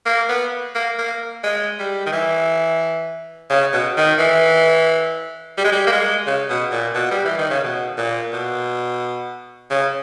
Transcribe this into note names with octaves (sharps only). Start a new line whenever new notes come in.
A#3
B3
A#3
A#3
G#3
G3
D#3
E3
C#3
B2
D#3
E3
G3
G#3
G3
A#3
G#3
C#3
B2
A#2
B2
G3
E3
D#3
C#3
B2
A#2
B2
C#3